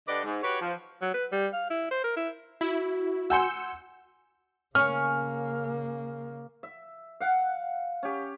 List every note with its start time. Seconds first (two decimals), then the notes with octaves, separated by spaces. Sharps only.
0.08 D3 G4 B4 D5 D#5
0.25 G#2
0.43 F#4 G4 B4 C#5
0.61 F3
1.02 F#3
1.14 B4
1.32 G3
1.53 F5
1.70 E4
1.91 C5
2.04 A#4
2.16 E4
2.61 E4 F#4
3.30 F#5 G#5 C6 E6 G6 C#7
4.75 C#3 A#3 C#4 F6
6.63 E5
7.20 F5 F#5
8.03 C#4 G4